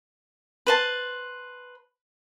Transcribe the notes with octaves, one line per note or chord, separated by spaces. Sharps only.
B4 C5 A5